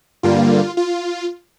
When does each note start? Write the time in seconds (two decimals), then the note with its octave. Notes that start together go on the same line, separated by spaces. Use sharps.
0.23 G2 D3 G3 A#3 F4
0.77 F4